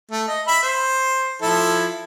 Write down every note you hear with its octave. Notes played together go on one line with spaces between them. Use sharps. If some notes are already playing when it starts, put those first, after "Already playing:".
A3
D#5
E5 B5
C5
F3 E4 A4